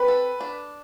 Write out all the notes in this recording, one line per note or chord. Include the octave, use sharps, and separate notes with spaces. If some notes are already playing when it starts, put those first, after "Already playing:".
Already playing: C4 B4
A4
D4